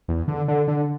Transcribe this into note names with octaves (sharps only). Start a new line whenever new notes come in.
E2
D3
D3
D3